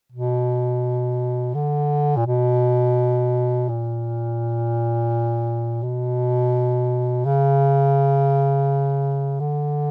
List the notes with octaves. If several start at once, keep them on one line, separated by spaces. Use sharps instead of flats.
B2
D3
A#2
B2
A#2
B2
C#3
D3